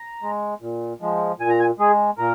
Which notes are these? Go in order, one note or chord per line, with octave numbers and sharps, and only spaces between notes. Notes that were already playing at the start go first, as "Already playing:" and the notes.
Already playing: A#5
G#3
A#2
F3 G#3
A#2 G#5
A#5
G#5
G#3 G#4
A#2 A#4